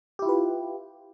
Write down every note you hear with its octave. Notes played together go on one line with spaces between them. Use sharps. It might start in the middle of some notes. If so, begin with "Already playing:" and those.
E4 F4 G4 B4